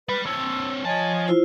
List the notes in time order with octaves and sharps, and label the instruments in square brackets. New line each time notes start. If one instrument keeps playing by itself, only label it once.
[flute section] B4 [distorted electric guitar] D5 B5
[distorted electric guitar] C4 C#5 [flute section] A5 E6
[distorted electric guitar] F3 A5 [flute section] C#5 D#5 G#5
[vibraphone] E4 F4 C5